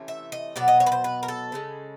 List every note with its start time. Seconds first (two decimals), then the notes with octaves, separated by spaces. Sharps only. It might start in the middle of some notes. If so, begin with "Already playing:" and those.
Already playing: C3 E3 A3 C#4
0.08 E5
0.32 D#5
0.56 B2 F#3 B3 D5
0.68 D#5
0.80 C#5
0.86 B4
0.92 C5
1.04 B4
1.23 A#4
1.28 A4
1.52 C#3 E3 G#3